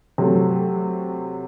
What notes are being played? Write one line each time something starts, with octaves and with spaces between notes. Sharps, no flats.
C3 F#3 A3